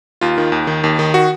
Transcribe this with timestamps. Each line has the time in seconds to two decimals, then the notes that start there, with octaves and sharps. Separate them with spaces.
0.21 D#2 F4
0.38 D#3
0.52 D#2
0.67 D#3
0.84 D#2
0.99 D#3
1.14 F#4